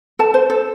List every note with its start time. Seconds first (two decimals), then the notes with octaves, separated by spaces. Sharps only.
0.19 A4 A5
0.34 C5
0.50 A4